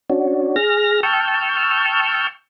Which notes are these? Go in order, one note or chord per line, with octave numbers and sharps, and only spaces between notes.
C#4 D4 F#4
G#4 F6 A#6
G5 A5 C#6 E6 F6 G6